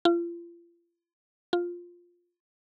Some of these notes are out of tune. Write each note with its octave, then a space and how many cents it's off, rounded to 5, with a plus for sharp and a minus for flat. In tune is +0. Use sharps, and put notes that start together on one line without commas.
F4 -35
F4 +5